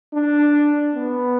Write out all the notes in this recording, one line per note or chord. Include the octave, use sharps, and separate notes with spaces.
D4
B3